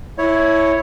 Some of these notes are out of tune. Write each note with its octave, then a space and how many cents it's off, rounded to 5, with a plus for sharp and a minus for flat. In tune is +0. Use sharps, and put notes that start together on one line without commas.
E4 -5 C#5 +0